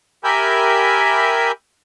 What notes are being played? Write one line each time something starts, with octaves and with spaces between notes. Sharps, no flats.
G4 A#4 E5 G#5 B5 G6